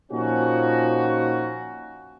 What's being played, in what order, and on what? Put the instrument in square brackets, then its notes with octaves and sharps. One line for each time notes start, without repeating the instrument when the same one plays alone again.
[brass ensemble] A#2 F3 C#4 D#4 F#4